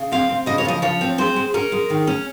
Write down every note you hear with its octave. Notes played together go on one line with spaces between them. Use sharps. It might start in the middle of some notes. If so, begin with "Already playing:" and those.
Already playing: C#3
C4 F5
C4
C#3 D#5
C#5
F3 D#5
F3 C#5
C4
G#3 C5
G#3
C#4 A#4
G#3
D#3
C#4